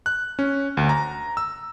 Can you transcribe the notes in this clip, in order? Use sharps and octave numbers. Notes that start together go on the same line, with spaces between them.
F#6
C#4
D2
A#5
E6